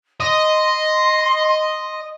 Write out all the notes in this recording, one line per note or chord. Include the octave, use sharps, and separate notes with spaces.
D#5 C6